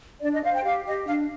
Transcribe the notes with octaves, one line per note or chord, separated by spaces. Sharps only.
D4 D5
D#5
C5 F5
G5
G4 F5
G4 D#5
D4 F5